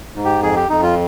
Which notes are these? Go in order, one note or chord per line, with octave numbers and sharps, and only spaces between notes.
G#2
G4
F2 G#4
G4
F2 D#4
F4